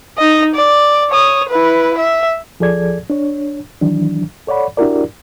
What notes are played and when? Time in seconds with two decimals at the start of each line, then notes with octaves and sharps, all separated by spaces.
0.18 D#4 D#5
0.55 D5
1.10 C#5 D#6
1.49 E4 B4
1.98 E5
2.60 D2 F3 G#4 A4 D5 G#6
3.10 D4 C#5
3.81 D#3 E3 F#3 D4
4.47 A4 C#5 D5 F#5 B5
4.77 D4 E4 F#4 G4 A#4 D5